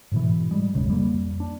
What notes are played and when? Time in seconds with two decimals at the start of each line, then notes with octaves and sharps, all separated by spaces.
0.12 G#2 B2 E3
0.51 G3 G#3
0.75 F1 B1 C#3
0.88 F2 G3 A#3
1.40 D4